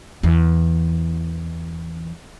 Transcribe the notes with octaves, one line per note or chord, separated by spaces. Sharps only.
E2 E3